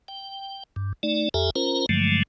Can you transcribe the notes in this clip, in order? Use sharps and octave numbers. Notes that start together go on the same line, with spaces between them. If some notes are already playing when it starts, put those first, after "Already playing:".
G5
G2
A3 D#4 D5
F2 G4 A4 E5 G#5 A#5
C#4 F4 A#4 C5 A#5
G2 D3 F3 F#3 G#3 A3